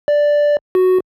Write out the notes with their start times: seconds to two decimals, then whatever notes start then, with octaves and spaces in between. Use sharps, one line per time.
0.08 D5
0.75 F#4